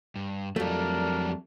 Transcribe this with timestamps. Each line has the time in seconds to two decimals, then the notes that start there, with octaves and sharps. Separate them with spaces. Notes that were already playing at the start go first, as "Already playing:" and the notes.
0.16 G2
0.56 F2 F#3 G3 A3 D4 A#4